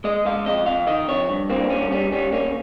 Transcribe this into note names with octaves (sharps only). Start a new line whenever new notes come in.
G#3 D#5
G#3 F5
F2 D#5
F2 F5
D#3 D#5
F2 C#5
G2
A#3 C4
G2 C#4
G3 C#4
G3 C#4
A#3 C#4